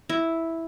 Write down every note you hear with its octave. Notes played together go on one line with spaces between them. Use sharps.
E4